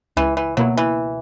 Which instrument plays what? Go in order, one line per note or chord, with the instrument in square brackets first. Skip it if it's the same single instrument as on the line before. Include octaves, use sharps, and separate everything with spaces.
[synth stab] C#2 [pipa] E3
[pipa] E3
[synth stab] B2 A#3 E4 [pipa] F#3
[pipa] E3